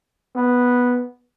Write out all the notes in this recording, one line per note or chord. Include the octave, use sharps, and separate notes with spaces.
B3